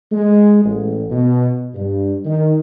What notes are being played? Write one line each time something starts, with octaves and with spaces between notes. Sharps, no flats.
G#3
A1
B2
G2
D#3